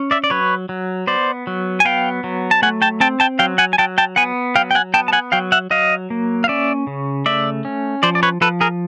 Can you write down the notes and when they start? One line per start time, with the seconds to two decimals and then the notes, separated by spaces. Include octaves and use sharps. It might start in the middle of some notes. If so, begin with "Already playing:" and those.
Already playing: C#4
0.11 D5 E5
0.24 D5
0.30 F#3 B4 C#5
0.69 F#3
1.07 B3 C5 D5
1.47 F#3
1.80 G#5
1.85 B3 F5 G5
2.24 F#3
2.51 A5
2.62 A3 F#5 G#5
2.82 G5 A5
3.00 C4 G5 A5
3.20 G5 A5
3.39 F#3 F5 G5
3.58 F#5 G#5
3.73 G#5
3.78 F#3 G5 A5
3.98 G5 A5
4.16 B3 F#5 G#5
4.56 F#3 F5 G5
4.71 G5
4.75 F#5 G#5
4.94 B3 G5 A5
5.08 A5
5.13 F#5 G#5
5.32 F#3 F5 G5
5.52 E5 F#5
5.70 F#3 D#5 F5
6.10 A#3
6.44 F5
6.48 C#4 D5 E5
6.87 C#3
7.26 A3 D5 E5
7.65 C#4
8.03 F3 C5 D5
8.15 D5
8.23 B4 C#5
8.41 F3 A4 B4
8.61 G#4 A#4